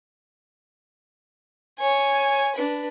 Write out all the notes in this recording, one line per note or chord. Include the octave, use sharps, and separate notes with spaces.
C#5 G#5
D4 B4